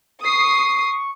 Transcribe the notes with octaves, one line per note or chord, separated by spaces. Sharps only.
C#6 D#6 C7